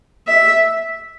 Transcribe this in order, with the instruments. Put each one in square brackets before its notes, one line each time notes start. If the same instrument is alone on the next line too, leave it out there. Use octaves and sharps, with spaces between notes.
[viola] E5